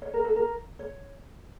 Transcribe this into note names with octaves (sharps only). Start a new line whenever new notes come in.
C#5
A#4
A4
A#4
C#5